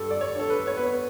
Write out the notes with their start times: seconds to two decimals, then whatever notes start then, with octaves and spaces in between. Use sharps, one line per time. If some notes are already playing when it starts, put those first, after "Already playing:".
Already playing: G2 A4
0.11 D5
0.21 C#5
0.35 D4 A4
0.50 B4
0.67 C#5
0.77 B3 B4